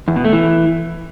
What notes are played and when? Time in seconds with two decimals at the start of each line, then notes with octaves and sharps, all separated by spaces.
0.08 E2
0.16 B2
0.25 A3
0.33 E3